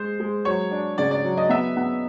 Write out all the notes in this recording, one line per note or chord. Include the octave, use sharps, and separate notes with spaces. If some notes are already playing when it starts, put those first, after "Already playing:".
Already playing: G#3 C5
G#3
F#3 C#5
D4
C#3 D5
D5
F#3
D#5
B3 E5
B3